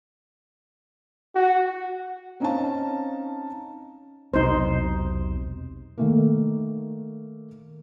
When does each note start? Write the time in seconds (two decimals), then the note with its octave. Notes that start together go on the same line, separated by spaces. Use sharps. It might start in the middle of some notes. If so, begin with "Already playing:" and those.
1.35 F#4
2.40 C4 C#4 D#4 C#5 F5 A5
4.34 E1 B1 C3 D#4 C5
5.98 D#3 A3 A#3